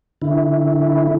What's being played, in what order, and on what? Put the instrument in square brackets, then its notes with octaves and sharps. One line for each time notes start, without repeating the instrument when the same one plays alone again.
[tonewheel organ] D3 E4